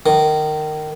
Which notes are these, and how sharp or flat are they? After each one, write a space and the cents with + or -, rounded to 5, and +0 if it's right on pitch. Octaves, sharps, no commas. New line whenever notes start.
D#3 -20